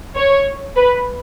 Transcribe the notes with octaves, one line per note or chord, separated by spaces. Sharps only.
C#5
B4